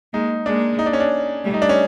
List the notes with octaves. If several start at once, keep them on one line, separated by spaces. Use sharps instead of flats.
G#3 A#3 D#4
G#3 A#3 D4
D#4
D4
C#4
D4
G3 A3
D#4
D4
C#4